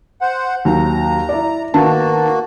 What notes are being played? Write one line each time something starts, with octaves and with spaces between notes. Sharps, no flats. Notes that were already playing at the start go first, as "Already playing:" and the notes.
C5 F#5
D#2 F#3 A#5
E4 D5
D#3 A#3 B3 F#4 A5